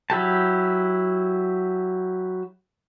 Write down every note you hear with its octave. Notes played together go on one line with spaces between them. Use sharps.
F#3 E4 G4 A5